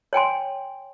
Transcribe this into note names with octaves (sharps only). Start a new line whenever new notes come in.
C#5 G5 G#5 C6